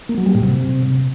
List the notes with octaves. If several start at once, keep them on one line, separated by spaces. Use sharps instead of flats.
A#3
F#3
G3
A2
C3